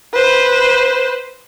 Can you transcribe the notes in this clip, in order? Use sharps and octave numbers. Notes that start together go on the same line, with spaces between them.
B4 C5